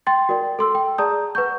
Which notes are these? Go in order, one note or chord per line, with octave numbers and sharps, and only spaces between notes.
G5 C6 A6
F#4 A#4 D5 G5
A4 C6 E6
G5
G#4 D5 A5 A#5 D#6 G6
B4 F#5 C#6 G6